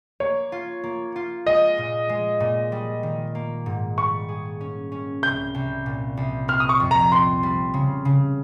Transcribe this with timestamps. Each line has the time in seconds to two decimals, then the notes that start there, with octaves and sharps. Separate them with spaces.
0.20 A#3 C#5
0.52 F4
0.83 A#3
1.16 F4
1.47 G#3 D#5
1.78 A#2
2.09 G#3
2.40 A#2
2.72 G3
3.03 D#3
3.35 A#3
3.66 G#2
3.97 G3 C#6
4.29 G#4
4.61 C#4
4.92 C#4
5.23 C2 G6
5.54 C2
5.86 A#2
6.17 C2
6.48 C4 F6
6.60 D#6
6.69 C#6
6.80 F2
6.91 A#5
7.12 C4 C6
7.43 G3
7.74 C#3
8.05 C#3